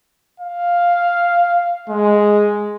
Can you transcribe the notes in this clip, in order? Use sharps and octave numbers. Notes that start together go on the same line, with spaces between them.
F5
G#3